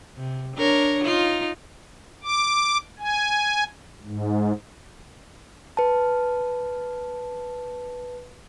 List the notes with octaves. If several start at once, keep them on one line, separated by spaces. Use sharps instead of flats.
C3
D4 A#4 C#5
D#4 F4
D6
G#5
G#2
B4 A5